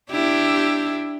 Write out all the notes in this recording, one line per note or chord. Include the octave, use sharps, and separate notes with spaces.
D4 E4 G4